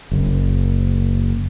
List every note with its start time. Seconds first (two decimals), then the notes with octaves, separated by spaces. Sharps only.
0.12 F#1